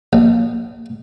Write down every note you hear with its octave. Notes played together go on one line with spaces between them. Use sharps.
A#1